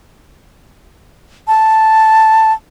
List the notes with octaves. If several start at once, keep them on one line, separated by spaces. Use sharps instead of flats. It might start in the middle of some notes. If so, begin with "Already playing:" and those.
A5